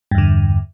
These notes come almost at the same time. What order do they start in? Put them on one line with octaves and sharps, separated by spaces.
G2 E2 D3